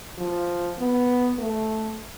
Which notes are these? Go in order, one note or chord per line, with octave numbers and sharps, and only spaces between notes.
F3
B3
A3